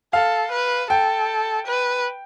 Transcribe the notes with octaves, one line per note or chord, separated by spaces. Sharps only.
A4 F5
B4
A4 G5
B4